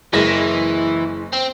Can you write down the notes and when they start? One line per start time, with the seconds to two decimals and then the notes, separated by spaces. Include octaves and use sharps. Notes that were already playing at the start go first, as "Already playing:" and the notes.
0.13 F#1 E3 G#3 A#6
1.33 C4